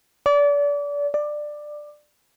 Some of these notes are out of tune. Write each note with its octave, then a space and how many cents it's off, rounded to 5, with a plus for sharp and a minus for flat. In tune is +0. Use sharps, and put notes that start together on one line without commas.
D5 -30
D5 +15